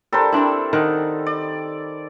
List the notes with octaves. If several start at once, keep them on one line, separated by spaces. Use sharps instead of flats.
G3 D4 A4 A#4 C5
C4 D4 E4 E5
D#3 D#4 F#5
D5